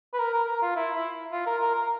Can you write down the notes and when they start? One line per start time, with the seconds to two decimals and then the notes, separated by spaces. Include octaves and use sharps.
0.14 B4
0.19 A#4
0.34 A#4
0.48 A#4
0.62 F4
0.76 E4
0.95 E4
1.32 F4
1.46 A#4
1.61 A#4
1.75 A#4